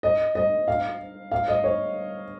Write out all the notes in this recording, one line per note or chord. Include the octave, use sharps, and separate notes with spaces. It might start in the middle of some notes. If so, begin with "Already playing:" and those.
D#5
D#5
F5
F5
D#5
C#5